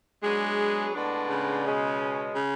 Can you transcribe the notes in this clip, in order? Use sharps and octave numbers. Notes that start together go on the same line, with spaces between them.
F#3 G#3 B3 D4 G#4
A2 G#3 B3 D4
C#3
B2 G#3 C#4
C#3